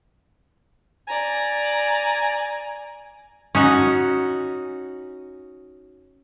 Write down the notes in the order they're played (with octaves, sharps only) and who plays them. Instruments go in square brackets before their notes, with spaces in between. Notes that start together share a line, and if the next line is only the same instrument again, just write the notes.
[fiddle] D5 A#5 [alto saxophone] G#5
[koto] C#4 D#4 F#4